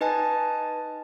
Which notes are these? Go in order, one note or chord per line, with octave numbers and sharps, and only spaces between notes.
D#4 B4 D#5 G#5 A5